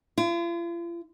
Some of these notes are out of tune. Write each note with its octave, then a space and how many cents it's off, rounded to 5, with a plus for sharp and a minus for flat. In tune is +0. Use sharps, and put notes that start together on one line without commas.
F4 -45